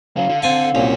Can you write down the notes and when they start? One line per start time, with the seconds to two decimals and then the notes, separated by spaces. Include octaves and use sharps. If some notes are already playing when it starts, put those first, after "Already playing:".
0.17 C#3 F#3 F5
0.29 D3
0.42 C4 F5 G#5 A5
0.75 C2 A#2 C#4 F#4